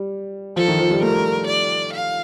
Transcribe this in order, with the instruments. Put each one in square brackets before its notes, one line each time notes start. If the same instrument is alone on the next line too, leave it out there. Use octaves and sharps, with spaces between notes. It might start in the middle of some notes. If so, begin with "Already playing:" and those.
Already playing: [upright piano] G3
[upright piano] F3 [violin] A4
[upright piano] D#3
F3
G3
[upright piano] A3 [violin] A#4
[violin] D5
F5